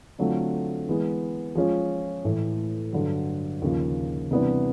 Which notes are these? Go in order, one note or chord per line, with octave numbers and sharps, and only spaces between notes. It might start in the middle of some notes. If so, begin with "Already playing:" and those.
D3 F#3 A3 C4 F4
E3 G#3 B3
F3 G#3 C#4 F4
A2 E3 A3
G2 D3 F#3
D#2 C#3 F3
C3 E3 G3 B3 D4